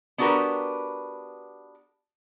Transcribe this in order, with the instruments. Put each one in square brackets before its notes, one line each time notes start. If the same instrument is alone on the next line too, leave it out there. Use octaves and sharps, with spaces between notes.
[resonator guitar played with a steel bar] B3 D4 F#4 G4 A#4 B4